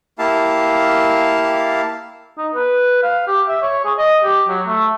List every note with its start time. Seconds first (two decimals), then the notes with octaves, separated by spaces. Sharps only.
0.19 A#3 E4 G4 F5 A5
2.38 D#4
2.54 B4
3.03 F5
3.27 G4
3.48 E5
3.62 C#5
3.85 G#4
3.98 D#5
4.24 G4
4.49 F#3
4.67 A3